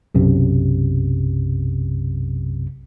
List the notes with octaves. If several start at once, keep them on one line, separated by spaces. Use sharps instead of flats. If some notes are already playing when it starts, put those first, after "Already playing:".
B1 F#2 C3